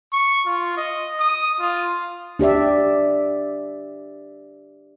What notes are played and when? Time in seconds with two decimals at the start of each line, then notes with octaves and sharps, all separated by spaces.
0.13 C#6
0.46 F4
0.77 D#5
1.19 D#6
1.60 F4
2.39 D4 G4 D5 E5